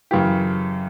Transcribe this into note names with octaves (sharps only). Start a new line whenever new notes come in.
F#2 C#3 E3 G4